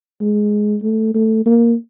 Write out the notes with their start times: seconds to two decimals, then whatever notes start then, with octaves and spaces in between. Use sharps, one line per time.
0.21 G#3
0.83 A3
1.15 A3
1.46 A#3